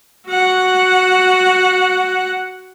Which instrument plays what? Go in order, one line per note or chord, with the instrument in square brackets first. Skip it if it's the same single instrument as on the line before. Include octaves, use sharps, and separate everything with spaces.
[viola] F#4 F#5